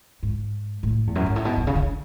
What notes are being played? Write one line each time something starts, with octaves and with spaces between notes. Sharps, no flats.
G#2
A2
E2
F#2
G#2
A2
B2
B2
C#3
D3